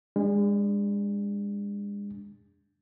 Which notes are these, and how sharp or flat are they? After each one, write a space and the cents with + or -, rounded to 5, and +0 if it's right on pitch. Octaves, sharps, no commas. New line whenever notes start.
G#3 -35 D4 +0